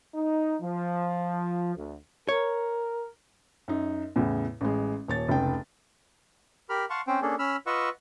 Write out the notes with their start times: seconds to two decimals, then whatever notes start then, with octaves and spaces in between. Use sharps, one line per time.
0.14 D#4
0.61 F3
1.76 D2
2.29 A#4 C#5
3.68 F#2 D#4
4.16 E2 A2 C#3
4.61 A1 G#3
5.08 D#1 C#5 A6
5.28 F1 C#2 G5
6.69 G4 A#4 B5 F6
6.90 F5 F#5 A5 C6 C#6
7.07 C4 C#4 C5 G5
7.22 A#3 C#4 D4 G#4 A4
7.39 C#4 B5 E6 F6
7.67 F4 B4 D#5 F#5 C#6 E6